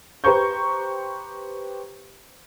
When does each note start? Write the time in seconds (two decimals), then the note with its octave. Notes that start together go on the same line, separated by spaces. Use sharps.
0.24 G4 B4 C5 A#5 C#6 G6